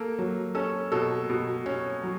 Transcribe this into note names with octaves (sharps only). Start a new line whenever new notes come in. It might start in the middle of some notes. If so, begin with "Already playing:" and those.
Already playing: A#3 A4
F#3
C#4 A4
B2 A4
B2
C#4
F#3